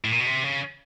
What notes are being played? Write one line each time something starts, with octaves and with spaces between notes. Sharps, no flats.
A2
A#2
B2
C3
C#3